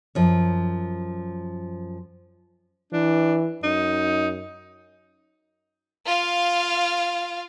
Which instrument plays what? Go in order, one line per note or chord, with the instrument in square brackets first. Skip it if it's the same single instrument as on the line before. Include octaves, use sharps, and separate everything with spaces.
[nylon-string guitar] F#2 F3
[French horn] E3 [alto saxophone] D4
[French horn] F#2 [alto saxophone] D#4
[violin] F4 F5